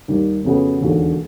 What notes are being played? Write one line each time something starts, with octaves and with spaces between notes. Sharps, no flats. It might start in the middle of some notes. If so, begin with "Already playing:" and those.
D#2 D#3 G3
F2 C#3 F#3 B3
E1 D#2 D3 F#3